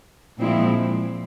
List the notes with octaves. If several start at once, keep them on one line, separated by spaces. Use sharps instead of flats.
A#2 F3 G#3 C4 E4